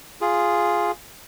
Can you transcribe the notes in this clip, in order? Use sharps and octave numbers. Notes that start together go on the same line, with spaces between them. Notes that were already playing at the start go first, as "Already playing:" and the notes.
F4 G#4